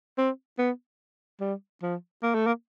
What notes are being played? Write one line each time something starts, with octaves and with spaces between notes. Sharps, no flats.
C4
B3
G3
F3
A#3
A3
A#3